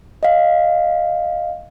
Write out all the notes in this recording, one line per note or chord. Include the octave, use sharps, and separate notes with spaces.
D#5 F5